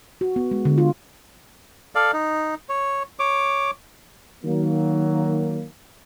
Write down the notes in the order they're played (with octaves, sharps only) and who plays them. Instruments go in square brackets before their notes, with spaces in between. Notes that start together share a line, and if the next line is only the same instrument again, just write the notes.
[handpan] F#4
B3
G#3
D3
F4
[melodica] A4 D5 F5
D#4
C#5
C#5 D6
[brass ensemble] D#3 F#3 A#3